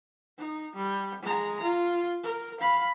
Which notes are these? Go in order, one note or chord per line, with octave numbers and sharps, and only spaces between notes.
D#4
G3
G#3 A#5
F4
A#4
F5 B5